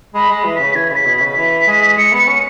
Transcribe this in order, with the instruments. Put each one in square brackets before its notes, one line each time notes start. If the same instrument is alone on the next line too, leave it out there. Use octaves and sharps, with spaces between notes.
[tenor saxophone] G#3 [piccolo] B5
[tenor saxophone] G#3
[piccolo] B5
[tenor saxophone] E3
[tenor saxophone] C#3 [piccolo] B6
[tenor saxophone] E3 [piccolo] G#6
[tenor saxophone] C#3 [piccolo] B6
[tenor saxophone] B2
[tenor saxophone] C#3 [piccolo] B6
[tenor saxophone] E3
G#3
[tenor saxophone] G#3 [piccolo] C#7
[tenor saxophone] B3
[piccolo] C#7
[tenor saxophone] C#4